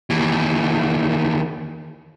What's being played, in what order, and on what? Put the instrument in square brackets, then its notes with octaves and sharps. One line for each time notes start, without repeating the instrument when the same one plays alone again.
[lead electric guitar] D#2 E3